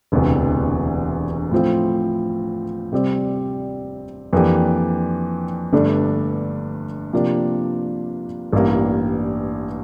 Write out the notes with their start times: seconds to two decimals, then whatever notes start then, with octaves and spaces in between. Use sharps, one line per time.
0.12 E1 D2 C3 E3
1.52 A2 F3 C4 F4
2.92 C3 G3 C4 G4 D5
4.33 F2 E3 A#3 D4 G4
5.73 G1 G2 D3 A3 D4
7.13 C3 F3 A#3 D4 G4
8.53 A1 G2 E3 G3 A#3